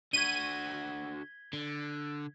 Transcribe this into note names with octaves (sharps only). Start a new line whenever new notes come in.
D3 F#4 G#6 B6 D#7 G7
D3